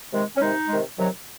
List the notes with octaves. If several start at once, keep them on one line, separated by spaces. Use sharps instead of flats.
C3 D#3 G#3
C#4
C3 D#3 G#3 D#4
C3 D#3 G#3
C3 D#3 F#3